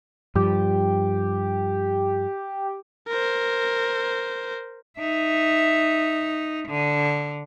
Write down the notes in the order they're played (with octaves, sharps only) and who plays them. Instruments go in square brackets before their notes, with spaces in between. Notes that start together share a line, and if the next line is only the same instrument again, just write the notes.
[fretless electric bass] G2 F3 [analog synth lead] G4
[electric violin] A#4 C5
[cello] D#4 E5
D3